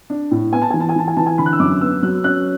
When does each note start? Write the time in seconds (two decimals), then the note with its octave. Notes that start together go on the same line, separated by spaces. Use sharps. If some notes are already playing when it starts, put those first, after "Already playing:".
0.10 D4
0.31 A2
0.52 B3 G#5
0.62 A5
0.70 E3 G#5
0.80 A5
0.89 G#5
0.96 E3 A5
1.08 G#5
1.17 E3 A5
1.26 G#5
1.38 D3 B5
1.46 F#6
1.53 E6
1.60 F#2 D6
1.81 B3 E6
2.03 F#3 F#6
2.24 C#4 F#6